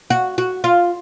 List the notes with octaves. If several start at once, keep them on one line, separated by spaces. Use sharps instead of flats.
F#4
F#4
F4